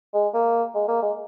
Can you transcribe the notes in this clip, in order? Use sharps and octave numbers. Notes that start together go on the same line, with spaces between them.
G#3
A#3
G#3
A#3
G#3